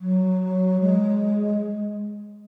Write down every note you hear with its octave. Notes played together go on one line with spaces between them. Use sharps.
F#3
G#3